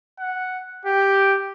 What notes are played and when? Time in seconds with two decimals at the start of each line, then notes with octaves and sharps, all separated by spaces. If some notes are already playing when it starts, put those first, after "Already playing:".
0.19 F#5
0.85 G4